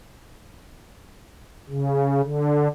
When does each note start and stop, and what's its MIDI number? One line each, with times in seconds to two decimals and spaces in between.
1.69 2.21 49
2.23 2.68 50